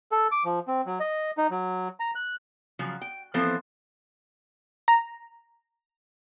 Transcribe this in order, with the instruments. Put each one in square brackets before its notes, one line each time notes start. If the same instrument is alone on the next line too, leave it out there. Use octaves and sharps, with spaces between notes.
[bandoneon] A4
D6
F3
C4
F#3
D#5
D#4
F#3
A#5
F#6
[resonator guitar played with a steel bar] C#3 F3 F#3
G5
E3 F3 B3 C4 A4 C5
[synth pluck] A#5